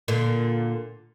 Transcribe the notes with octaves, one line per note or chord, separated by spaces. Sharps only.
A#2 D3